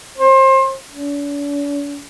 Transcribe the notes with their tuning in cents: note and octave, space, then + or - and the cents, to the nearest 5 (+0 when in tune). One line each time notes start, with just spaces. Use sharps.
C5 +30
D4 -45